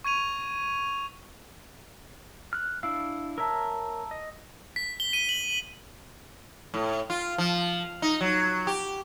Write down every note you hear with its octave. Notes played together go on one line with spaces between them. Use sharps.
C#6 G#6 D#7 F7
F6 F#6
D4 E4 F5 E6
A#4 C#5 E5 A5 A#5 E6
D#5
B6
G7
D#7
F#7
A2
F4
F3
D#4
F#3
G4